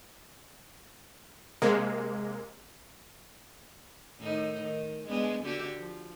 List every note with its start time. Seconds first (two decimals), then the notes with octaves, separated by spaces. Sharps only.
1.62 C3 G#3 A#3
4.20 A2 D#3 D#4
4.61 D#3
5.08 G#3 B3 D4
5.44 D3 F#4 G4
5.77 F3